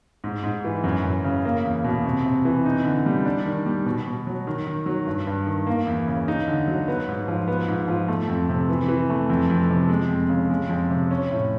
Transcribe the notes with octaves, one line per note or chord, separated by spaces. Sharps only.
G#2
G#2
E3
F#2
F#2
C#3
A#3
E2
B2
C3
C3
E3
D#4
D3
G3
D4
D#3
G3
B2
B2
F#3
D#3
D#3
F#3
G2
G2
D#3
A#3
E2
C#3
D#4
D3
F#3
B3
G#2
F3
B3
G#2
F3
A3
F2
C3
E3
E3
A3
F2
F2
C3
G#3
F2
C#3
G#3
F2
C3
C#4
A2